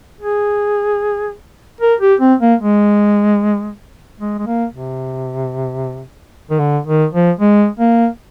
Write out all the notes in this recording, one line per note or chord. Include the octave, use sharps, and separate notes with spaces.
G#4
A#4
G4
C4
A#3
G#3
G#3
G#3
A#3
C3
D#3
D3
D#3
F3
G#3
A#3